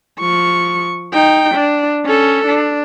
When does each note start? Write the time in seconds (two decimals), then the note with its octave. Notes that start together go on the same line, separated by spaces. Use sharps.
0.20 F3 C#6
1.13 D#4 G5
1.54 D4
2.06 C#4 A4
2.47 D4